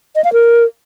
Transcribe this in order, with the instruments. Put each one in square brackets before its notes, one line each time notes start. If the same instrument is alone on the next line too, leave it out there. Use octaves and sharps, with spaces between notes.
[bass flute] D#5
F5
A#4